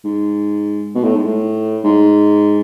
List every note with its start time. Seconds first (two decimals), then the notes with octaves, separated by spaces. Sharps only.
0.05 G#2
0.95 B2
1.05 A2
1.16 G#2
1.27 A2
1.84 G#2